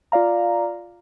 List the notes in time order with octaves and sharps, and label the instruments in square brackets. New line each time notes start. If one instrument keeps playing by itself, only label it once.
[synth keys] F4 D5 F5 A#5